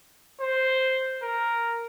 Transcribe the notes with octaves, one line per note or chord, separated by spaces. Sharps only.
C5
A#4